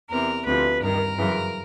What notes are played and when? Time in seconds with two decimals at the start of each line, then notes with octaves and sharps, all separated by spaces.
0.10 E2 C3 E3 A#4
0.46 D2 C3 F3 B4
0.81 G2 D#3 A#4
1.18 F#2 C#3 E3